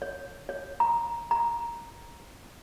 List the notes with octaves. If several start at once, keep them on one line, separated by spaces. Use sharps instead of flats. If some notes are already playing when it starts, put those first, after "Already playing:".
C#5
C#5
A#5
A#5